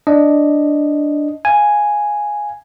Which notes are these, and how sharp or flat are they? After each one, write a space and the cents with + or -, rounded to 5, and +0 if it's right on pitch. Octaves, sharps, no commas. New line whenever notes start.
D4 +0 D#5 +0
F5 +0 G#5 +0